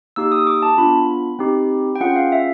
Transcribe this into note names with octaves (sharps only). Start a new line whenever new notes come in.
A#3 D#4 G4 E6
D#6
D6
A5
B3 D4 F4 B5
C4 D#4 G4
G5
C#4 F4 G#4 F#5
F5
E5